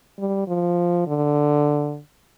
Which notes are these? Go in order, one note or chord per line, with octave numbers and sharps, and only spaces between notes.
G3
F3
D3